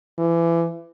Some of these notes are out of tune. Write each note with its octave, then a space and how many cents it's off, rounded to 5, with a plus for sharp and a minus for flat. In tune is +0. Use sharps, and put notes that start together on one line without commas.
E3 +30